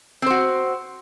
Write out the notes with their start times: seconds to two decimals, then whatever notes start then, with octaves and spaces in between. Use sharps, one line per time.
0.22 C4
0.26 C5
0.30 F#4